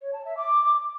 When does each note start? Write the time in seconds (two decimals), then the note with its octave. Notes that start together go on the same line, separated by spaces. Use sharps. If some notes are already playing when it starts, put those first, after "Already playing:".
0.01 C#5
0.13 A5
0.25 E5
0.37 D6